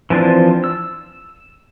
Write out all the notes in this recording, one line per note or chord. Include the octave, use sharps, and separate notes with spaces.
E3 F3 C4 D4 F4
E6